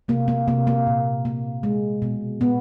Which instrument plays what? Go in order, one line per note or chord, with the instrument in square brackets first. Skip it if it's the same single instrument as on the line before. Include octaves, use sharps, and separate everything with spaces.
[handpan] C3 A#3
A#3
C3 A#3
A#3
A#2
A#3
G#3
B2
A#2 B3